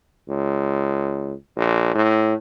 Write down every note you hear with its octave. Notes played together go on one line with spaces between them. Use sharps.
C#2
A#1
A2